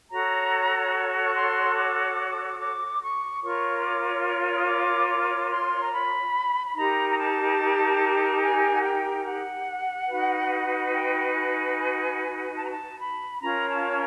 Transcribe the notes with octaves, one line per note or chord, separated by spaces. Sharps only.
F#4 A4 C#5 A#5
C#6
C6
D6
D6
C#6
F4 A#4 C#5 C#6
D6
D#6
D6
D6
C6
A#5
B5
B5
D#4 G4 A#4 A#5
A#5
A5
A5
G#5
F#5
G5
F#5
D#4 F#4 B4
G5
G#5
A5
A#5
A5
B5
C#4 F4 A#4 C#5 A#5
A5